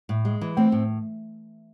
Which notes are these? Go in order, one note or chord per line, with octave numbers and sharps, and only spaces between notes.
A2
G#3
E3
A3 C4
A2